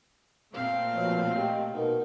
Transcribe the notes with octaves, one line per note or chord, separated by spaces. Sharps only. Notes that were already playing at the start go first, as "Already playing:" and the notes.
A#2 A3 C4 F5
B2 F3 C#5
G4 D#5
B2 D#4 A#4